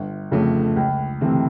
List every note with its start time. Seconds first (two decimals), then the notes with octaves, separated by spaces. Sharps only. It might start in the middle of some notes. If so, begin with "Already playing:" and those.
Already playing: G1
0.32 F2 C#3 F3 A3
0.76 C#2
1.21 C3 E3 A3 C4